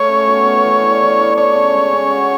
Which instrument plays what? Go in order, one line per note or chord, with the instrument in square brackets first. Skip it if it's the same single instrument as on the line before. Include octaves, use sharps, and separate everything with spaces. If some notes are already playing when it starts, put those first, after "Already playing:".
Already playing: [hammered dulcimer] A3 [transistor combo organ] C#5
[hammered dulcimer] C#4
B2
B2
E3
D4
E3
D4
[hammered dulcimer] D4 [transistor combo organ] C#5
[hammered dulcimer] C#3
G#3
C#3
F#4